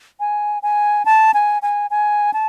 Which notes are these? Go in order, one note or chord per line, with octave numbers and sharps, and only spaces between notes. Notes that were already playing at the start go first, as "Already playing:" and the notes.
G#5
G#5
A5
G#5
G#5
G#5
A5